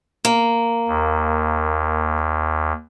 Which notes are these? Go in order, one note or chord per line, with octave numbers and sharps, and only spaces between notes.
A#3
D#2